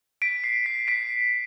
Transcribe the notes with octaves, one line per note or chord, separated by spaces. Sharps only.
B6 D7
C7
B6
B6 D7